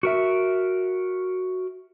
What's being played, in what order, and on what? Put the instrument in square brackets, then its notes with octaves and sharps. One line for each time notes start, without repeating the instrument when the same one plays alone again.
[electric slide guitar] F#4 A#4 E5